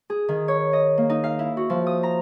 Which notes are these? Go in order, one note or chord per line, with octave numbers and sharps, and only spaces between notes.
G#4
D#3
C#5
D#5
A#3
D#4
F5
E4
F#4
F3
D#6
A#5